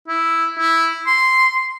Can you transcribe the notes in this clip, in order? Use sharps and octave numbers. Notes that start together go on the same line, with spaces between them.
E4
E4
C6